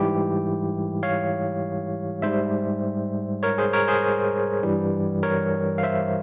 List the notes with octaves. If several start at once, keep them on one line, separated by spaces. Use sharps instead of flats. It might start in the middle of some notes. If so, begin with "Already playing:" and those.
Already playing: G#2 E3 G3 E4 G4
C#5 F5
G#2 G3 C5 E5
A#4 C#5
G#4 C5
A#4 C#5
G#4 C5
G2 E3 G3
A#4 C#5
F5
C5 E5